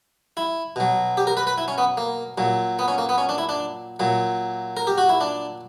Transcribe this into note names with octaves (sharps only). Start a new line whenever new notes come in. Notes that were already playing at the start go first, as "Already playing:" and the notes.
E4
B2 F#3
G4
A#4
B4
B4
E4
C#4
B3
A#3
A#2 F#3
B3
C#4
A#3
B3
C#4
D4
E4
D4
A#2 F#3
A#4
G4
F#4
E4
D4